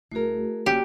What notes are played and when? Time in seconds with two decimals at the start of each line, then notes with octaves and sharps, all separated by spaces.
0.12 D#1 A3 E4 F#4 G#4 A#4
0.66 F#1 G3 A#3 C#4 F#4 G4